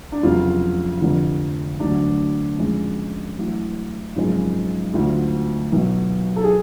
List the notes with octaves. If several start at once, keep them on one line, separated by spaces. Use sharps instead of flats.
D4
F1 F2 C#3 F#3 F4
F1 F2 D3
D2 D3 F#3 D4
F2 C#3 G#3
A1 A2 F#3
G#1 F#2 C#3 F3 G#3
D2 D3 F#3 F4
B1 B2 F#3
A4
G#4